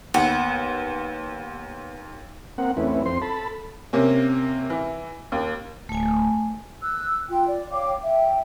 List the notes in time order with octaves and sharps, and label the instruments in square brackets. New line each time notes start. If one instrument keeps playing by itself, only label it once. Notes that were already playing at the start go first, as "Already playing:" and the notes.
[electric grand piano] D#2 [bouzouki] B3
[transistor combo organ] A#3 C4 F#5
E2 A3 C4 C#4 E4 B4
F2 C4 C5 C6
A4 A5 B5
[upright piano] C3 A#3 C#4
E3
D#2
[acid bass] D1 [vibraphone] A3 G#5
[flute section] E6 F#6
F4 G5
D5
C#5 F5 G5 D6
E5 G5